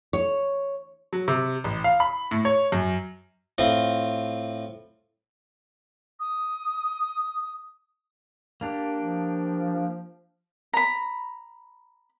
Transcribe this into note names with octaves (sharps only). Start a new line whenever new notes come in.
C#5
F#3
C3
A1
F5
B5
A2
C#5
F#2
A2 C4 F4
D#6
A#3 D4 G4
F3
A#5 B5